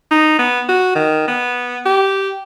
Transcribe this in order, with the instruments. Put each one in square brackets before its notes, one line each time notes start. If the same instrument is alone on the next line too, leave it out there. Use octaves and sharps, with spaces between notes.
[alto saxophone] D#4
B3
F#4
D#3
B3
G4